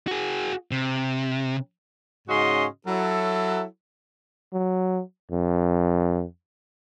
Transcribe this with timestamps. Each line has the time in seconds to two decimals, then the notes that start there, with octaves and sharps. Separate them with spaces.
0.07 F#4 G#4
0.71 C3
2.28 G#2 C#3 C#4 F#4 D#5 C6
2.87 F#3 E4 A4
4.53 F#3
5.31 F2